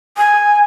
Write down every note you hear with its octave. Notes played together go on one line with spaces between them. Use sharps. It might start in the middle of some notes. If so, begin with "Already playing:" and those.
G#5